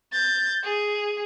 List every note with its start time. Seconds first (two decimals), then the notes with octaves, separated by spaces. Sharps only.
0.12 G6 A6
0.63 G#4